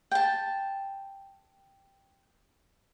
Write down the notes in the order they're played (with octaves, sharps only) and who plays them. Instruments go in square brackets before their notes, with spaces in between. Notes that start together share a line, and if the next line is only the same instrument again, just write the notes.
[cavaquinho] G5 A5